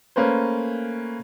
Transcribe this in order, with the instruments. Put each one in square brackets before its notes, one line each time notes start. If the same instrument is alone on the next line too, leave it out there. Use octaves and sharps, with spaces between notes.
[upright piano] A3 A#3 C#4 B4 C5